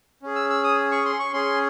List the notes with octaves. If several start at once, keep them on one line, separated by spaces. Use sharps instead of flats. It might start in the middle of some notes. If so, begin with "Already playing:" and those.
C#4 G#4
E6
E6
D#6
C#6
C6
C#6
C#4 G#4 C6